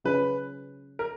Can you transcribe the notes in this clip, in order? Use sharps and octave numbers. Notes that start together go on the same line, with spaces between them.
C#3 F#3 C#4 F4 G#4 B4
A#4